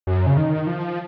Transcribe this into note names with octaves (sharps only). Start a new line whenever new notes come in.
F#2
C#3
D#3
F3